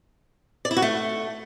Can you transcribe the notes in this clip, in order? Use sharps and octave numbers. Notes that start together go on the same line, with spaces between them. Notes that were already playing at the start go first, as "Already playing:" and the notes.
D5
E4
F#4
A3